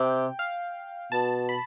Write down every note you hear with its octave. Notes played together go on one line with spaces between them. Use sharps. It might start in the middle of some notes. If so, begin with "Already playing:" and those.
Already playing: C3 G5
F5
B2 A5
B5